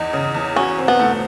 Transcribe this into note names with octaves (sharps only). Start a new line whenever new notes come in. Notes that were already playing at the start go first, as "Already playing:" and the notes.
Already playing: E2 D#4
C#3
E2
C#4 F#4
C4
B3
A3